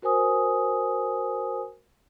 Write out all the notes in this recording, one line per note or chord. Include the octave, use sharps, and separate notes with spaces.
F#4 A#4 C5 G#5 D#6